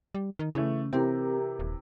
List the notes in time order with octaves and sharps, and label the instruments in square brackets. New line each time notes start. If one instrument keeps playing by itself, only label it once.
[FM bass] G3
D#3
[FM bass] C#3 [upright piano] E3 A3 [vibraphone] C#4
[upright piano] C3 E3 [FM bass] C4 [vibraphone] G4 A#4 A#5
[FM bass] D#1